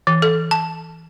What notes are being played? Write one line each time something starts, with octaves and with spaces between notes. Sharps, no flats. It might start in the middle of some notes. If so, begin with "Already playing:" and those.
E3
A4
A5